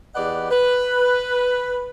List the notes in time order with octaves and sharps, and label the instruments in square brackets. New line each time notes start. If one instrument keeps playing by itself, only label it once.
[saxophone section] E2 G4 B4 D5 D#5 F#5
B4